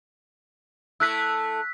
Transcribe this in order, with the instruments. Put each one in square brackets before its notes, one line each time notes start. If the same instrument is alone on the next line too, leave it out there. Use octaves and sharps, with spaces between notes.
[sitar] A3 E4 [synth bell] E6 F#6 B6